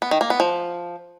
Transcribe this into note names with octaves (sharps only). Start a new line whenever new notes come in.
B3
D#3
A#3
B3
F3